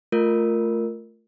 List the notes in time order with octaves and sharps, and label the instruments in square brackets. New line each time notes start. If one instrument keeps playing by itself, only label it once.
[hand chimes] A3 F4 A#4